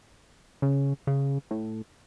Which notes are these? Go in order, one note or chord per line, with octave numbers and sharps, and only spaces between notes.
C#3
C#3
A2